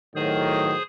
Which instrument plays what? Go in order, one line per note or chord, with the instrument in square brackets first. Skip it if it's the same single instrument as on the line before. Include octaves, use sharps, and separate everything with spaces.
[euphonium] A2 [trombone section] D#3 F#3 [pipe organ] G#4 C5 D#6